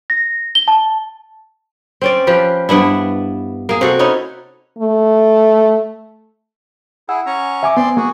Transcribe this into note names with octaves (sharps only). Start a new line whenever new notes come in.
A#6
G7
A5
C4 C#4 D5
F3 G4 B4
G2 B3 D4 E4
A#3 G#4
C3 F#4 A4
C#4 D#4 E4 C#5
A3
E4 G#4 F#5 E6
C#4 C#5 A#5
E5 G#5 D6
B3 C4 D5 G#5 C6
A#3 F#4 G#4